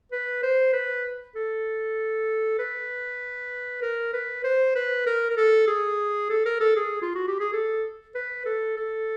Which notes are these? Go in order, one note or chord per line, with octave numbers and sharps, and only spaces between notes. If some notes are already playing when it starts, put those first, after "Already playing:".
B4
C5
B4
A4
B4
A#4
B4
C5
B4
A#4
A#4
A4
G#4
A4
A#4
A4
G#4
F4
F#4
G4
G#4
A4
B4
A4
A4